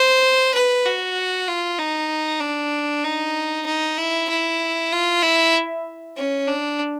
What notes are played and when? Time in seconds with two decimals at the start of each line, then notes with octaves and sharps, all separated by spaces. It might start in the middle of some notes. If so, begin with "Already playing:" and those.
Already playing: C5
0.54 B4
0.86 F#4
1.48 F4
1.79 D#4
2.41 D4
3.04 D#4
3.66 D#4
3.98 E4
4.29 E4
4.92 F4
5.22 E4
6.16 C#4
6.47 D4